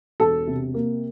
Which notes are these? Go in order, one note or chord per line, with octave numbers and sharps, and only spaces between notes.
E1 A4
C3
A#3